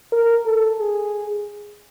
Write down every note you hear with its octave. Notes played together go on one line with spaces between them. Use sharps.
A#4
A4
G#4